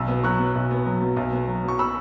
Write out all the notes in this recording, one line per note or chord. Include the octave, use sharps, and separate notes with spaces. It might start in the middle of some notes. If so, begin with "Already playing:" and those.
Already playing: B1 F#3 B5 E6
B3
F#3 C#6 F#6
B2
B1
B3
F#3
B2
B1
B3
F#3
B2 C#6
B5 E6